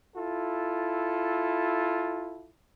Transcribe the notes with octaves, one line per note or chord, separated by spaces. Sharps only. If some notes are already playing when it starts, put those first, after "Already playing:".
E4 F4 A4